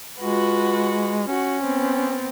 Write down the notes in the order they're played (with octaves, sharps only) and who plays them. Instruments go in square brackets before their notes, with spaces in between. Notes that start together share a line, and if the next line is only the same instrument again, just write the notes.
[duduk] G#3 [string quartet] F4 F#4 B4
[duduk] C#4 [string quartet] F#4
[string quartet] B3 C4